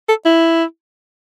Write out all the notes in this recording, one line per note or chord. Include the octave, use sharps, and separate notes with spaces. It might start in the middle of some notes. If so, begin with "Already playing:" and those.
A4
E4